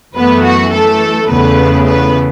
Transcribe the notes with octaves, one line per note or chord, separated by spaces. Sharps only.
F#2 E3 A3 B3 B4
F#4
A3 A4
E2 C#3 A3 B3 B4
B3 B4